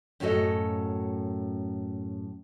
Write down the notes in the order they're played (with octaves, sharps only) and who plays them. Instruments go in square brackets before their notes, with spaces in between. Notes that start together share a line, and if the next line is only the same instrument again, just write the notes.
[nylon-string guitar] F#2 A2 C#4 F#4 A4 D#5